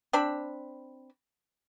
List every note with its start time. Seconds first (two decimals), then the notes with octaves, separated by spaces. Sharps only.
0.13 C4 D4 B5